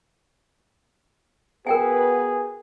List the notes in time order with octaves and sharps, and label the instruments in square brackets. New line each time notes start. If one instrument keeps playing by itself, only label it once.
[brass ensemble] B3 F#4 B4 [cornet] G#4 [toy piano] A#4 G5 G#5